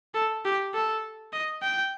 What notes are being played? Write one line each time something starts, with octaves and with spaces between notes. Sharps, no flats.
A4
G4
A4
D#5
G5